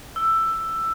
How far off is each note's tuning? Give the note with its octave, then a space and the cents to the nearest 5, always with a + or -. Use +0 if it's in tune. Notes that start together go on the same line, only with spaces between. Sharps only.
E6 +10